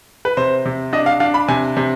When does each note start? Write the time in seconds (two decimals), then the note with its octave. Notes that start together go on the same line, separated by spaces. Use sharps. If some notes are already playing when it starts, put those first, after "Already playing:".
0.25 B4
0.37 C3 C5
0.65 C3
0.93 D4 D#5
1.06 F5
1.20 D4 F5
1.34 B5
1.48 C3 G#5
1.77 C3